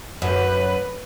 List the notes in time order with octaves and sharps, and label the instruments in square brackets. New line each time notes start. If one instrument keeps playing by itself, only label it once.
[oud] F#2 [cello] B4